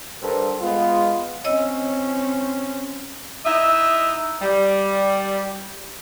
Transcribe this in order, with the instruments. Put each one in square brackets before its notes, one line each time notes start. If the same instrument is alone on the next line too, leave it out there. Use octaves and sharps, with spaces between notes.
[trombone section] G2 A4 A#4 C5
G#3 B3 F4
[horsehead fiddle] C4 C#4 [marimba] C#5 D#5 E6
[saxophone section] D#4 E4 D#5 E5
G3